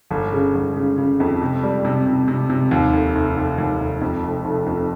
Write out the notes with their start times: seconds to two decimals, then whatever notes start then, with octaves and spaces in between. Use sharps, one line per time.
0.11 G1
0.33 C#3
0.55 G1
0.76 C#3
0.98 C#3
1.20 F2
1.42 C3
1.63 G3
1.85 C3
2.06 C3
2.28 C3
2.50 C3
2.71 D#2
2.93 F1
3.15 F1
3.37 F1
3.58 D#2
3.80 F1
4.01 F2
4.23 F1
4.45 F1
4.67 F2